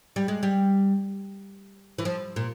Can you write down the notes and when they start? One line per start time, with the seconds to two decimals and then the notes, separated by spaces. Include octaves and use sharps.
0.16 G3
0.28 G#3
0.43 G3
1.98 E3
2.05 F3
2.36 A#2